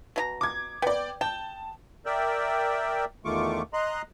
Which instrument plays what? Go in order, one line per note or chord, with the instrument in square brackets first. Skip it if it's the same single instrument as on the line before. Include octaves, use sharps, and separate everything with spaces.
[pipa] B2 E4 A#5
[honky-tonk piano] D6 G#6
[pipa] B3 [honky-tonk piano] D5 G5
[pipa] G5 [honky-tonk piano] A5
[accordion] A#4 D5 E5 G5
E2 D#3 A3 F4 C#6 D6
D#5 A#5 C6 F#6